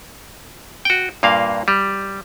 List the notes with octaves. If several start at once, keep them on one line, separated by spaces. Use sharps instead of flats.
F#4 G5
G2 A#2 A#3 F5
G3